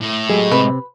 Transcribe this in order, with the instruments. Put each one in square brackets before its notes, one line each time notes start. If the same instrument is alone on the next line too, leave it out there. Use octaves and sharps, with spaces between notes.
[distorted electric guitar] A2
[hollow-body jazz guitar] F#3 A3 G4 [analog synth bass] G#3
[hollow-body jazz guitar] C3 C4 [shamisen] B4